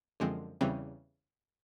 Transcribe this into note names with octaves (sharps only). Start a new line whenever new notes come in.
F#2 D3 F3 G#3 C4
E2 C#3 E3 G3 C4